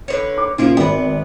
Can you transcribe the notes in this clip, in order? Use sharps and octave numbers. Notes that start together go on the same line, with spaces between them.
D3 B4 C#5
D6
A#2 C#3 F3 E4 F4
G#1 B3 B4